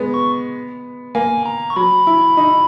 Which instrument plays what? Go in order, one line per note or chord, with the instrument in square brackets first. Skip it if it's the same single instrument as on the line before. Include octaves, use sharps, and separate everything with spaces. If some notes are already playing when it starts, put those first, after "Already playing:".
Already playing: [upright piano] G#3 B3
[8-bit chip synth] C#6
[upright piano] A#3 [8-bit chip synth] G#5
[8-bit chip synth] A#5
C#6
[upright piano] F#3 [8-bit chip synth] B5
[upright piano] E4
D#4